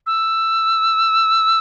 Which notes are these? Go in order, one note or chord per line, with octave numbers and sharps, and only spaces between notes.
E6